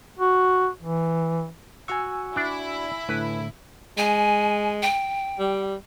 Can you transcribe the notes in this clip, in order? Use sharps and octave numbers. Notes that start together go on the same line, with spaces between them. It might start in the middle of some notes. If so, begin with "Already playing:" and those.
F#4
E3
F#4 F#5 G#5 C#6 E6
D4 E4 D5
A2 D3 B4
G#3 G#5
G5
G3